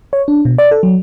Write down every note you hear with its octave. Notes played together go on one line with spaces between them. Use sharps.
C#5
D4
B2
D5
A4
F#3